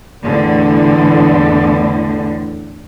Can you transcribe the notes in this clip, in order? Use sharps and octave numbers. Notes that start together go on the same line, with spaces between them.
E2 A2 D3